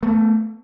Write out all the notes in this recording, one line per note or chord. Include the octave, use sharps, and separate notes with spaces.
A3 B3